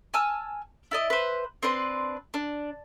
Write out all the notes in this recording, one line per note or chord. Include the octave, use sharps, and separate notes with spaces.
G#5 A5 E6 F6
E4 D5 D#5
B4 C5
C4 D4 B4 C6
D4